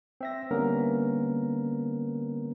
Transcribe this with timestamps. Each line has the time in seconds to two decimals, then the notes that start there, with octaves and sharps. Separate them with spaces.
0.21 C4 E5 A#6
0.51 D3 G3 A#3 B3 C#4 A#4